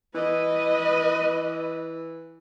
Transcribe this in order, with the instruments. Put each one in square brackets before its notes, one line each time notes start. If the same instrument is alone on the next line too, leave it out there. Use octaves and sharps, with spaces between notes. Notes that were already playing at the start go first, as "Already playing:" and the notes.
[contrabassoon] E3 [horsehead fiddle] B4 D#5